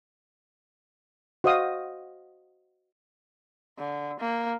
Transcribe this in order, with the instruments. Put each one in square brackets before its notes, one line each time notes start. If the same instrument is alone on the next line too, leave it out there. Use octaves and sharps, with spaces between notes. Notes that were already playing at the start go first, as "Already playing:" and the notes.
[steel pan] F#4 C5 D#5 F5 D#6
[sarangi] D3
A#3